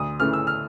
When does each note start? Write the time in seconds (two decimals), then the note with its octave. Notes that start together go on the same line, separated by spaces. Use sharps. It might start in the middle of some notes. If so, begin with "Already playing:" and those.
Already playing: D2 D#6
0.20 C#3 E3 A3 F6
0.33 E6
0.47 F6